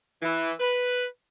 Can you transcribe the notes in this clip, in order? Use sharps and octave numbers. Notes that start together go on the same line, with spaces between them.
E3
B4